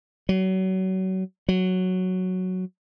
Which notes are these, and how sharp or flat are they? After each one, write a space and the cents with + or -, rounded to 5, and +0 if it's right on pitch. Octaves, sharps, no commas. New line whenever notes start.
F#3 +30
F#3 +0